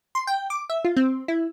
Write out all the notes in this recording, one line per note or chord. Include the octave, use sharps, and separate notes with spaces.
C6
G5
D6
E5
F4
C4
E4